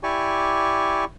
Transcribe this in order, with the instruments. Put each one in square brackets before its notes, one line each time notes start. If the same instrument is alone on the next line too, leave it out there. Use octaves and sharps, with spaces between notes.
[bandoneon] E4 G4 D5 G#5 C#6